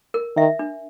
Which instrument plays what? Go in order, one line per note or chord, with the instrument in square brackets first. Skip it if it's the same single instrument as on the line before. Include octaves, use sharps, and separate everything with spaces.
[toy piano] A#4
[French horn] D#3 [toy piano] E5
[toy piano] D4